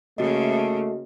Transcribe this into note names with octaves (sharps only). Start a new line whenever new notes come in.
C#3 A3 A#3 F#4 D#5